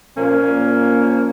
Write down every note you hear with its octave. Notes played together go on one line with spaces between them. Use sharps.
A#2 F3 A#3 C#4